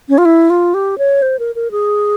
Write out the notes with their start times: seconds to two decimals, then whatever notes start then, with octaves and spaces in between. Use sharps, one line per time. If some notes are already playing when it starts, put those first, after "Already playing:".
0.09 C#4
0.18 F4
0.25 E4
0.50 F4
0.74 G4
0.98 C#5
1.22 C5
1.39 A#4
1.55 A#4
1.71 G#4